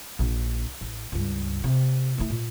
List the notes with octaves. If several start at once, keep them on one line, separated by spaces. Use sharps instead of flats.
A#1 D3
A1
C#2 G2
C3
A3 E4
A#2